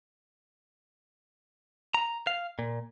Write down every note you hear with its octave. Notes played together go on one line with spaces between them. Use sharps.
A#5
F5
A#2